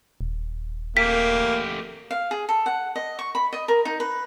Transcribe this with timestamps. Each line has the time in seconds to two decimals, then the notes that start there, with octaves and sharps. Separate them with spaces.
0.21 D#1
0.97 A3 A#3 G4 B6
2.11 F5
2.31 G#4
2.49 A4
2.66 F#5
2.96 D#5
3.19 C#6
3.35 B5
3.53 D#5
3.68 A#4
3.85 D#4
4.00 B4